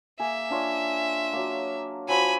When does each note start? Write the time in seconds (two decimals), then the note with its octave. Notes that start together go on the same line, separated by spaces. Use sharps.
0.19 A#3 G#4 E5
0.50 D4 F4 C#5
1.33 F#3 A#3
2.08 F3 F#3 G#5 B5